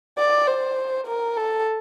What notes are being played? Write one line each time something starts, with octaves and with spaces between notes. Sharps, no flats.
D5
C5
A#4
A4